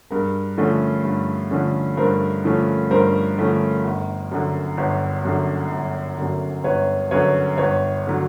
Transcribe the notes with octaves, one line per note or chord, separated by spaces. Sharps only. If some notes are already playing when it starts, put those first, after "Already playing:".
G2 G#4 A#4
D3 F3 A3 C#4
G2
D3 F3 A3 C#4
G2 A#4 C5
D3 F3 A3 C#4
G2 A#4 C5
D3 F3 A3 C#4
G1
F#2 D3
G1 B4 C#5
F#2 D3
G1
F#2 D3
G1 B4 C#5
F#2 D3 B4 C#5
G1 B4 C#5
D3 F#3